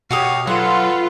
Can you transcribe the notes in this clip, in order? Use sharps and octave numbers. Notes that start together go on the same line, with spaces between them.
B2 F#4 G4 C#5 F5 D#6
F#3 F4 A4 B4 F#5